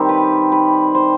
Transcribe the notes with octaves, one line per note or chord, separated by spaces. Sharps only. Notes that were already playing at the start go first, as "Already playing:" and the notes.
Already playing: D#3 G3 C4 D#4 G4
B4
B4
C5